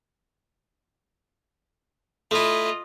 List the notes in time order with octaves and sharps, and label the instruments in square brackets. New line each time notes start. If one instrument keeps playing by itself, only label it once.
[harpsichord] A3 E4 [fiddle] F4 D#5